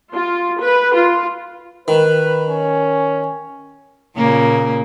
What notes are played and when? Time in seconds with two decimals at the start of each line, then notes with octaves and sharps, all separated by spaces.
0.13 F4
0.61 B4
0.96 F4
1.88 D#3 B4
2.47 C#4
4.17 A#2 C#3 A#3